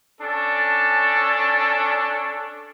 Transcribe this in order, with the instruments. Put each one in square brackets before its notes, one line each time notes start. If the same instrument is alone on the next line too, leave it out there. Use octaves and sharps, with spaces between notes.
[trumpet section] C#4 D4 A4